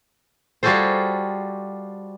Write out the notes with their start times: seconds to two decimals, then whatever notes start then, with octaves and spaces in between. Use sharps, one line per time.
0.63 G3 F4 F#4 G#4 A4 C5